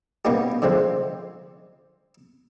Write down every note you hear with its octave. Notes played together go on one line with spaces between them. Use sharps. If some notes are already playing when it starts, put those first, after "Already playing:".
B2 A#3 B3 C#4 D#4 G4
D3 F3 G#3 C4